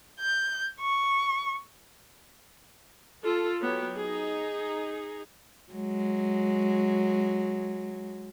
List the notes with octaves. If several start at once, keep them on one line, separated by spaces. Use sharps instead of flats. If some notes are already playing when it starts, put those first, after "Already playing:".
G6
C#6
F4 A4
F#3 B3 G4 C#5
D#4 G#4
F#3 G#3